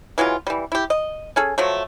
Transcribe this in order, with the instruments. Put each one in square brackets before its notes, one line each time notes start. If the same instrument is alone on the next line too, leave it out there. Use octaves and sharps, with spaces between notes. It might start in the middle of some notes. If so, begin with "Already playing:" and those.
[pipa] E3 F#3 G#3 F4
E3 G3
E4 G4
D#5
C#4 G#4 A4
F3 F#3 A3